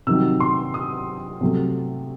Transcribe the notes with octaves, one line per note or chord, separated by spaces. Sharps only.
C3 D#3 F#3 E6
C6
D#6
C3 F#3 A3